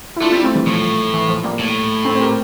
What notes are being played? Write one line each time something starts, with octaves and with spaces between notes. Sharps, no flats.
E4
A3 D4 F4
G3 C4 E4
A3 C4
E3 G3
A2 F3
E3
F3
G3 A#3
A2
A3 C4
C5
G4 A#4